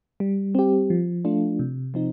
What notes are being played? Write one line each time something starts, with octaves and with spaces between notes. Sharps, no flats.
G3
C4 G4
F3
A3 D4 F4
C3
F3 C4 D#4